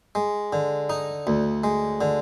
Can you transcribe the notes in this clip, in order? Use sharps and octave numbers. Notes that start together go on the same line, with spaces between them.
G#3
D3
D#4
D2
G#3
D3